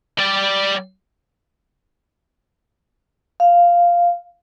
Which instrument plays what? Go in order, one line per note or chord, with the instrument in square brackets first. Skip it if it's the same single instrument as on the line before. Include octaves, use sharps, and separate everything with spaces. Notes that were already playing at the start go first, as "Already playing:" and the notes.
[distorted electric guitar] G3 D5
[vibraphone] F5